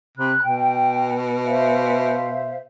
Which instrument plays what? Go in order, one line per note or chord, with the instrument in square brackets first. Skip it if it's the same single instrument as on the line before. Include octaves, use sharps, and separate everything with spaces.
[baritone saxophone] C3 [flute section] B5 F#6
[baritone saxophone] B2 [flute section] G5
[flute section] C5 E5 F5